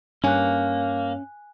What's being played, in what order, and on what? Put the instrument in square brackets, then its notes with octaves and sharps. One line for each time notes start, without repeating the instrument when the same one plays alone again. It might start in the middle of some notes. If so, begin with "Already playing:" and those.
[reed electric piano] G2 C#5 [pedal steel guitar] A#3 [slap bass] C#4 [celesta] G#5 F#6